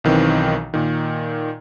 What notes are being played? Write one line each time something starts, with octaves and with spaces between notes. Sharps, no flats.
B1 D#3 E3 C4
A#2 D#3